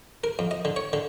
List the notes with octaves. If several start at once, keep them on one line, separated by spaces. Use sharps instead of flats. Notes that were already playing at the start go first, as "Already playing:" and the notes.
A#4
F2
D#5
D3
C#5
D3